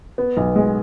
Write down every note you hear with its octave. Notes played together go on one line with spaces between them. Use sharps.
B3
B1
G#3